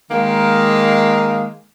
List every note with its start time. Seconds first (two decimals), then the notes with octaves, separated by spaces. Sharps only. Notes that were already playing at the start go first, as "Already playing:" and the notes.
0.11 D#3 G#3 A#3 F5